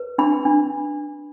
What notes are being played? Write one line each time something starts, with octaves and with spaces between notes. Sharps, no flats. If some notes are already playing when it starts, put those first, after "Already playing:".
Already playing: B4
D4 B5
D4